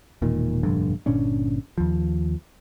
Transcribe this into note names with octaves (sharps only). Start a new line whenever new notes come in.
E1 A#2 D#3
F1 A#1 G2 D3
G1 A#2 C#4 D4
D#2 F3